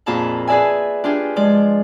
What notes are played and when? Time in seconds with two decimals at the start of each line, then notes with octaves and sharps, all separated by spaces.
0.06 F2 A#2 F4 G#4 A5 B5
0.47 G#4 B4 D5 E5 G#5
1.04 D4 F4 G4 G#4
1.36 F3 G#3 D5